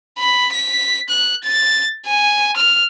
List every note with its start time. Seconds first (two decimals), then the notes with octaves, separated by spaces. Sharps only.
0.19 B5
0.53 B6
1.09 F#6
1.44 A6
2.07 G#5
2.57 F6